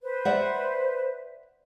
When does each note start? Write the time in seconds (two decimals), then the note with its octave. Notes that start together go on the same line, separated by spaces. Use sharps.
0.03 B4 C5
0.25 D5 E5 F#5